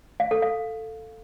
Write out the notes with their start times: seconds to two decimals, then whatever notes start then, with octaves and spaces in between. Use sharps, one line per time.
0.20 F5
0.31 A4
0.42 F5